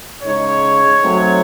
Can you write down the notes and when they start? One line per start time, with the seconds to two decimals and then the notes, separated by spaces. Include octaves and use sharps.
0.23 C#3 G#3 D#4 C#5
1.01 F#3 A3 C4 D#4